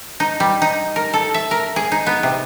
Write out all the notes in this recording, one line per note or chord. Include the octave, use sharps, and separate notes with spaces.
D#4
G3
D#4
A#4
A4
E5
A#4
G#4
D#4
B3
C3